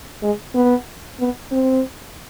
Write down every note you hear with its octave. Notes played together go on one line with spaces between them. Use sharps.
G#3
B3
B3
C4